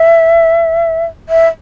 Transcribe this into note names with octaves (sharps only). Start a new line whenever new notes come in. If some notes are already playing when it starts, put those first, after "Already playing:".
Already playing: E5
E5